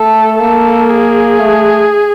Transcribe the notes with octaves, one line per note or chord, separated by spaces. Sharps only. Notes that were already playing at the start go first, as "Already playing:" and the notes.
Already playing: A3 A4
A#3 A4
G#4
A3